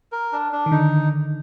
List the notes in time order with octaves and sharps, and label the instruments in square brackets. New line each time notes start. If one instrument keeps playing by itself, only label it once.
[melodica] A#4
D4
D4
[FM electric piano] D#3
[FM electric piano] D3 [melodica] D#4